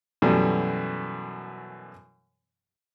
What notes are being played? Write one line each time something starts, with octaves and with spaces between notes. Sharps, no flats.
F#2 B2 E3 G3 A3